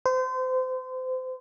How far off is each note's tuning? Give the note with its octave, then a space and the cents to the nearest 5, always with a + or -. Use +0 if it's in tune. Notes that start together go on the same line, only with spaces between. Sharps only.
C5 -30